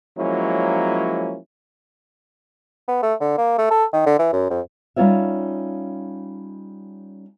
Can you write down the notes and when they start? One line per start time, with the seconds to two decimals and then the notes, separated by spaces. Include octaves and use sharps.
0.17 F3 F#3 G#3 A#3 C#4 E4
2.88 B3
3.03 A3
3.20 D3
3.38 A#3
3.58 A3
3.71 A4
3.93 D#3
4.06 D3
4.19 E3
4.33 F#2
4.50 F2
4.96 G3 C#4 D#4 F4 C#5 E5